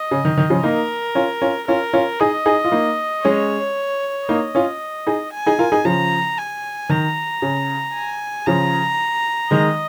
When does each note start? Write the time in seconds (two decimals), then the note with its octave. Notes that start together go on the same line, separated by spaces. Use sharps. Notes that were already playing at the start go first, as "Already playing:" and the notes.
Already playing: D#5
0.11 C#3
0.25 D#3
0.37 D#3
0.50 C#3 F3
0.63 A#3 D#4 A#4
1.15 C#4 F4
1.42 C#4 F4
1.68 C#4 F4 A#4
1.93 C#4 F4
2.20 D#4 G#4 D#5
2.46 D#4 G#4
2.65 F4
2.72 A#3 D#4
3.24 G#3 C#4 C#5
4.28 A#3 D#4 D#5
4.55 C#4 F4
5.07 D#4 G#4
5.33 G#5
5.46 D#4 G#4
5.59 F4 A#4
5.72 D#4 G#4
5.85 C#3 F3 A#5
6.38 G#5
6.89 D#3 A#5
7.42 C#3
7.94 G#5
8.47 C#3 F3 A#5
9.51 D#3 G#3 D#5